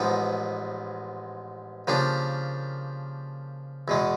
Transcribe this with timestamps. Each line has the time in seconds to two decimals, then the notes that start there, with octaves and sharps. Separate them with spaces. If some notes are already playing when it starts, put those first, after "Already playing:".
Already playing: A1 G#2 F3 G#3 B3
1.87 C#3 F3 A#3 D4 G4
3.88 E2 B2 G#3